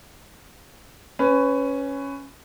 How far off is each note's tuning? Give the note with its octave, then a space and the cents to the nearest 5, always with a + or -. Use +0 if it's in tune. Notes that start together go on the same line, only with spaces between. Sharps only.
C#4 +0 B4 +20